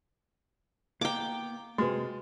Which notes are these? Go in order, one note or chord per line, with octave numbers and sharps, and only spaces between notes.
A#3 B3 G5 A#5 D6
C3 G#3 F4 F#4 B4